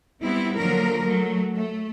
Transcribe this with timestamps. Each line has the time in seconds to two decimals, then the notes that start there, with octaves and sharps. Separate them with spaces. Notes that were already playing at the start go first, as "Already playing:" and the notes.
0.22 G3 B3 C4 E4
0.57 D3 F3 F#3 A#3 A#4
1.06 F#3 A3
1.55 A3